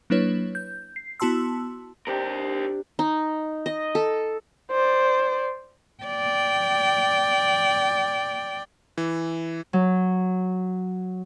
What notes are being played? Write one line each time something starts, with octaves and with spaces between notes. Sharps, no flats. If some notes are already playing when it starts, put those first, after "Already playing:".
F#3 A#3 D4 E4 B4 C#5
G6
C7
B3 E4 F#4 A5 C6 E6
C3 D4 G4 A#4
D#4
D#5
A4
C5 D5
D5 G5
E3
F#3